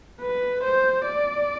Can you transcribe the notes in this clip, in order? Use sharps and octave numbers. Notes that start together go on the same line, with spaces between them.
B4
C5
D5